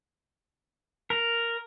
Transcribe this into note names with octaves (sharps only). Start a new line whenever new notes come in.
A#4